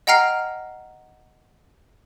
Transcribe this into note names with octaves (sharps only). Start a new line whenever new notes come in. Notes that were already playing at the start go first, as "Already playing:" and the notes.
D#5 F#5 G5 A#5 F6 C7